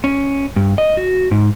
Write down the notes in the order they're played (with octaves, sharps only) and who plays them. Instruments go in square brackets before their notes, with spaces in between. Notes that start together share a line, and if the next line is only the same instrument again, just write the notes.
[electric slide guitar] C#4
G2
D#5
F#4
G#2